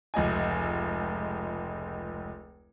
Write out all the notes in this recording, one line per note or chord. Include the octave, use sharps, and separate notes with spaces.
F1 C#2 D#5 G#5